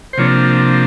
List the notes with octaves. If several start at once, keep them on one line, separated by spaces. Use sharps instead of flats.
C5
C3 F3 A#3 D4 C#5